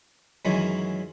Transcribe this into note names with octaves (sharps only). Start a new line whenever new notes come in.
F#2 D#3 E3 F#3 G#3